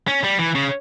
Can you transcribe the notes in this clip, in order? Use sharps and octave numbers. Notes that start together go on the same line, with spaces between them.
C#4
G3
E3
C#3